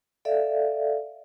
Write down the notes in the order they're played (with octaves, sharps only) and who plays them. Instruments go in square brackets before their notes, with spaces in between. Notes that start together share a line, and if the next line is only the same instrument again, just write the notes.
[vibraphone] A4 D5 E5 F5